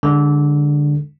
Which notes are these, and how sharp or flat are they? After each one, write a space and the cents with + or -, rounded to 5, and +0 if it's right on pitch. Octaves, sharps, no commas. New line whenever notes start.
D3 +0 G#3 -25